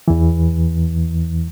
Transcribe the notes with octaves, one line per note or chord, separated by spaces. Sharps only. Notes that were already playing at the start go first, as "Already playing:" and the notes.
E2 E3